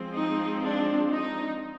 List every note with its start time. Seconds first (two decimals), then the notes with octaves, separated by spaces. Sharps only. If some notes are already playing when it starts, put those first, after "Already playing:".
Already playing: F3 G#3 C4
0.12 D#4
0.62 D4
1.12 D#4